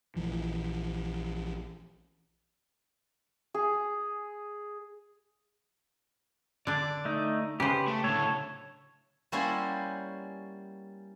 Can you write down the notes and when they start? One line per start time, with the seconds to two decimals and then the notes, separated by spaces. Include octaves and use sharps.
0.16 A#1 E3 F3
3.54 G#4
6.67 D3 D4 D5
7.05 A3 D#4
7.60 C#3 G4 B4 C5
7.88 A3
8.04 A2 D3 A4 C#5
9.32 G3 A#3 C#4 E4 F#4 C5